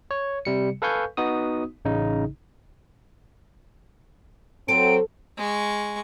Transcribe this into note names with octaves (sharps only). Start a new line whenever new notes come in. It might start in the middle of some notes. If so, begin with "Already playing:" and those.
C#5
C3 G3 C#7
A4 B4 F5 G#5 C#6 G6
B3 D#4 F#4 D#6
A1 C#3 D#4
F#3 C4 A4 D7
G#3 C#6